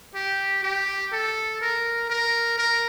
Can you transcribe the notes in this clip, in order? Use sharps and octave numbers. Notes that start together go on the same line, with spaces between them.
G4
G4
A4
A#4
A#4
A#4